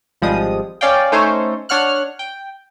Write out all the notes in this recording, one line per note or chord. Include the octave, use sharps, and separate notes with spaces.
G#1 F3 G3 G#3 D#6
C#4 D5 F5 G5
A3 C#4 D#4 A4 C5 C#5
D4 C#5 F#5 F6 F#6
G5